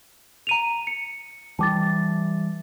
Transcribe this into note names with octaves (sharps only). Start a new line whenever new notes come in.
A#5 D#7 F7
C#7
E3 G3 A5 D6 A6